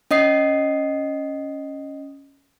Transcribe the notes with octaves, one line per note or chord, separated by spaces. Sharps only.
C#4 D#5 D#6 C7